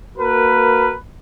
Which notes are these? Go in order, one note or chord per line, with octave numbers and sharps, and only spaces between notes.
A#3 F#4 A#4 B4